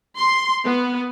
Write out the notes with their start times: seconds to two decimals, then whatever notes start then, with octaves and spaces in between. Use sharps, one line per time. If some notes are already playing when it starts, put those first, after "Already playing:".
0.16 C6
0.65 B3